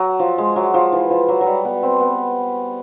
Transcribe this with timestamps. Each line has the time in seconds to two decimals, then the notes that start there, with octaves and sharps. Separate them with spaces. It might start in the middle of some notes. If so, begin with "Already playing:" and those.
Already playing: F#3
0.19 F3
0.38 G#3
0.56 F#3
0.74 F3
0.92 E3
1.10 F3
1.28 F#3
1.41 F#3
1.47 G3
1.65 B3
1.83 C4
2.00 B3